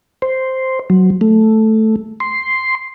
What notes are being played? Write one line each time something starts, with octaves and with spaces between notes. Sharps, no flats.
C5
F#3
A3
C6